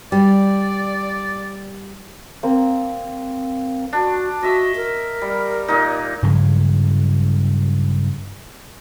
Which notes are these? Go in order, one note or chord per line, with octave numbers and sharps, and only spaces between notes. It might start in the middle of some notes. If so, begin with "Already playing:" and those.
G3 D5
A#3 C4
D4 F#4
F#4 D#5 E5
A#4
G3
A#2 D#4
G2 C#3 F3 F#3